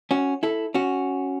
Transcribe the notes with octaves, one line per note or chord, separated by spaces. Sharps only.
C#4 F#4
E4 A4
C#4 F#4